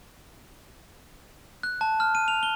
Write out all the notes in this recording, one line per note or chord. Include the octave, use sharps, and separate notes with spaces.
F#6
A5
F6
D#7
F7
G7